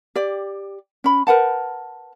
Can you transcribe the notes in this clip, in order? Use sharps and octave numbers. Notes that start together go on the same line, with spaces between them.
G4 D5
C#4 B5
A#4 B4 F#5 A5